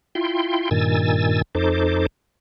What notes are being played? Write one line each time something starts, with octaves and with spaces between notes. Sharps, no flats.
E4 F4 G5 C6
G2 A#2 D#3 G#5 E6 A6
F2 D#4 A4 C5 D6